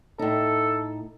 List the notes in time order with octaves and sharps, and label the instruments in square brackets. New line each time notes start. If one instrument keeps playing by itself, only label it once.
[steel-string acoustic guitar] A2 D#4 [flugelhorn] A4